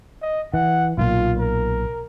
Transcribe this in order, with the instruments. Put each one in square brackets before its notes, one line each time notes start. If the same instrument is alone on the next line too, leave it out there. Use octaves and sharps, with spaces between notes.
[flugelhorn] D#5
[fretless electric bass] E3 [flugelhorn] F#5
[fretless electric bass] B1 A#2 [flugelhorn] F4
[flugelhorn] A#4